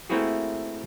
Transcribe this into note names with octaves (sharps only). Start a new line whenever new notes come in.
A3 A#3 C4 E4 F#4 G#4